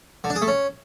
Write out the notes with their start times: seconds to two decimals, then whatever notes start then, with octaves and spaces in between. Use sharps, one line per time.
0.24 D3
0.30 D4
0.36 G#4
0.42 A3
0.47 C#4